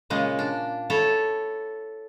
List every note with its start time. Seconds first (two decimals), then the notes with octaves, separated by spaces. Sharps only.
0.10 A#2 C#3 G#3 A#3
0.39 D4
0.90 E4 A4 C#5